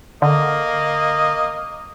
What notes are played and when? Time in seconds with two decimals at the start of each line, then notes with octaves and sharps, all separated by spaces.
0.22 D3 A#3 D#5